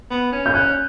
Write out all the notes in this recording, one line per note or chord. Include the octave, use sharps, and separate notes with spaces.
B3
C#4
G6
C#4 F#6